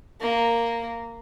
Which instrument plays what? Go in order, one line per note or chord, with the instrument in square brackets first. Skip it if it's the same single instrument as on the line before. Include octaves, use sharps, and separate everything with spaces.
[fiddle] A#3